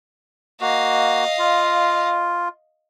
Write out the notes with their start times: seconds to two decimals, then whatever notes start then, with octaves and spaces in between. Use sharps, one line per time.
0.61 A#3 F#4 D#5 F5
1.39 F4